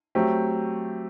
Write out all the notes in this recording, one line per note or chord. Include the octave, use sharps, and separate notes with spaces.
F#3 A3 C4 G4